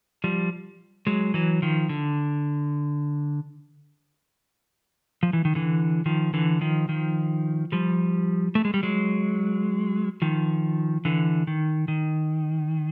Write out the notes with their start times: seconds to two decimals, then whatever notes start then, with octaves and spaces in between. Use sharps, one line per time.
0.24 F3 G3
1.07 F#3 G#3
1.34 E3 F#3
1.62 D#3 F3
1.89 D3
5.23 F3
5.33 E3
5.45 D#3
5.55 D3 E3
6.06 D#3 F3
6.34 D3 E3
6.61 D#3 F3
6.89 D#3 F3
7.72 F3 G3
8.55 A3
8.65 G#3
8.74 G3
8.83 F#3 G#3
10.22 D#3 F3
11.05 D3 E3
11.47 D#3
11.88 D#3